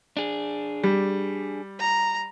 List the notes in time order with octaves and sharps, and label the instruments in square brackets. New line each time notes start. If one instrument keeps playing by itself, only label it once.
[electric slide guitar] D4 G#4
[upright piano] G3
[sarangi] A#5